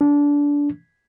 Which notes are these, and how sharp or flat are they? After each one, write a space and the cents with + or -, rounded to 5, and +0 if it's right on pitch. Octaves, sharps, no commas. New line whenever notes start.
D4 -20